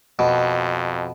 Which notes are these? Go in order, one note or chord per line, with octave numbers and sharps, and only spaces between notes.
F2 B2